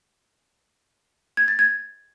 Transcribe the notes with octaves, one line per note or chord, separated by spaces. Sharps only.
G#6
A6
G#6